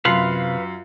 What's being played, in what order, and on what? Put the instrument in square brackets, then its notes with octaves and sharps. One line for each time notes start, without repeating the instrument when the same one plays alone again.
[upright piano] F#2 C7 [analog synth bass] C3 [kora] F4 [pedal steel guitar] B4 F5 B5